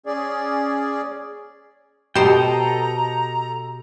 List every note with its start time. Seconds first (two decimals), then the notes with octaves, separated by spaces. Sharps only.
0.06 C#4 G#4 D5
2.15 B2 G4 A4 C5 D#5 G5 A#5